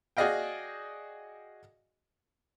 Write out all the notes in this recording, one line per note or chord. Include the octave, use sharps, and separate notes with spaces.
F#4 G#4 D5 D#5 F5 G5